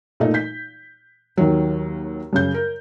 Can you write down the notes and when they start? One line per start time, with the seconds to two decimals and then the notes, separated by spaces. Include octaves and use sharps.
0.20 A#2 A3 D#4
0.34 G6 B6
1.37 D#2 D#3 F#3
2.33 F#2 C#3 G6
2.54 A#4